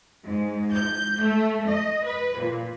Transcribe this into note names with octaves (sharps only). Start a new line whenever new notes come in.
G#2
G6
A3
D#5
B4
A#2